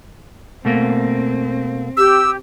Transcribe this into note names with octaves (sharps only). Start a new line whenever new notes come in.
B2 A3 A#3 C4
G4 E6